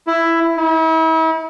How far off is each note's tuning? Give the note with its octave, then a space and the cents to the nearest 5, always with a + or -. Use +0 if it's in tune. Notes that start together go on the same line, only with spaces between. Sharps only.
E4 +10
E4 -40